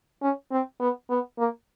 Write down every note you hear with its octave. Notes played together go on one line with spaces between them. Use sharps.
C#4
C4
B3
B3
A#3